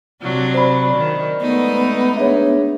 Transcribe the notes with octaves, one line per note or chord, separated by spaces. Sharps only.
C3 F#3 D4
C5 D5 B5
D#3
G#3 A3 B3 D#4
D4 G#4 B4 C#5 E5